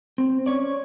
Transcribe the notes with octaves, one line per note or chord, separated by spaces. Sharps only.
C4
C#4 C#5 D5